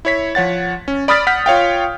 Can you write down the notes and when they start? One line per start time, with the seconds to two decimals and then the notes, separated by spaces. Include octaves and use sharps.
0.05 E4 C#5 B6
0.35 F3 C#5 F#5 A6
0.88 C#4
1.08 D5 B5 D#6 F6 A6 B6
1.27 F#5 F6 G6 B6
1.46 F4 C#5 F5 G5